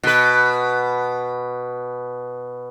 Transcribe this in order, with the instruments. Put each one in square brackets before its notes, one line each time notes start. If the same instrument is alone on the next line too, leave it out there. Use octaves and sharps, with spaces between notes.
[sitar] B2 B4